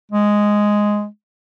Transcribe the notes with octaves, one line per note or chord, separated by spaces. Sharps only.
G#3